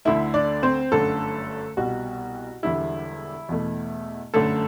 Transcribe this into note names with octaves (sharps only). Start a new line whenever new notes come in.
D2 D3 A3 E4 E5
D4 D5
C4 C5
G1 F#2 D3 A3 A4
C2 B2 G3 F#4
E1 E2 D3 G3 E4
E2 B2 A3
G1 F#2 D3 A3 A4